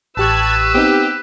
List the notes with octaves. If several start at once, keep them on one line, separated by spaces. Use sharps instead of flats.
A1 G4 B4 A5 C#6 E6 F#6 G#6
B3 C4 D#4 G4